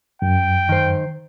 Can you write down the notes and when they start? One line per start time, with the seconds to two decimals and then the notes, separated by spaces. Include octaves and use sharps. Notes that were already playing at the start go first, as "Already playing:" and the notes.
0.22 F#2 G5
0.69 D#3 C5